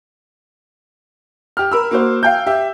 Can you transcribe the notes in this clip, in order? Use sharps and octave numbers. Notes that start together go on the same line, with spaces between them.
G4 F6
A#4 B5 E6
A#3 F#4 C5
F5 G5 G6
G4 E5